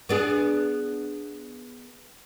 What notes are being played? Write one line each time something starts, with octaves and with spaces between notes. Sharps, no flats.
B3 D4 G#4